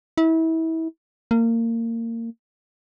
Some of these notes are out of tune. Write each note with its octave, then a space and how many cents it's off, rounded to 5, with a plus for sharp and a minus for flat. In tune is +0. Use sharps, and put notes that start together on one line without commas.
E4 -30
A#3 -25